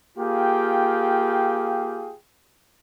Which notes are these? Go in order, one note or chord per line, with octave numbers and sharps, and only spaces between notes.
A#3 F4 G4 G#4 F5 G5